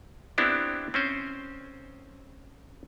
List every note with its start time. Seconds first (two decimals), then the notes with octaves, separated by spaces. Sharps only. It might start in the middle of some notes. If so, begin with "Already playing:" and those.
0.38 B3 C4 D4 E4 G4
0.94 C4 C#4 C5